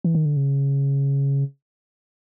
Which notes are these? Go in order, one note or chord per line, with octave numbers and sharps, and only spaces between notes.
E3
D#3
D3
C#3